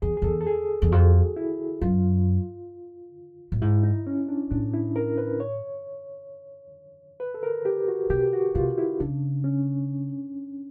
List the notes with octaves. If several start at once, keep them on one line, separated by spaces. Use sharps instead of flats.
E2 G#4
G#4
E2 A4
A4
G#4
E2
F2 F#4
E4
F#2 F4
A2
G#2 E4
D#4
C#4
D4
A2 D4
E4
A#4
B4
C#5
B4
A4
A#4
G4
F#4
B2 G4
F#4
C3 F4
E4
C#3 D4
C#4